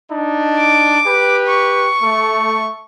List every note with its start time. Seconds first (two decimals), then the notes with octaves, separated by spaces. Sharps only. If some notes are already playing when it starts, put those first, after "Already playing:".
0.12 D4 D#4
0.58 D6
1.07 G4 B4
1.47 C#6
2.02 A3